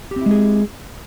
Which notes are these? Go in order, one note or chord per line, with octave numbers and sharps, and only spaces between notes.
G#3 C4 E4 G4 G#4